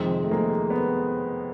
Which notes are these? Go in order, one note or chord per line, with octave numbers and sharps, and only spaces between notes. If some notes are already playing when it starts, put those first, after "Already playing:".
Already playing: F2 C3 D#3 G#3
A3
G#3 A#3
B3